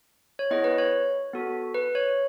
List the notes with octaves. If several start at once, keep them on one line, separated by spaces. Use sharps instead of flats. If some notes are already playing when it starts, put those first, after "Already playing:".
C#5
B3 E4 G#4 D#5
B4
C#5
B3 F#4 A4
B4
C#5